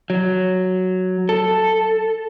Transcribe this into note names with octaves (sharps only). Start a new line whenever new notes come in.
F#3
A4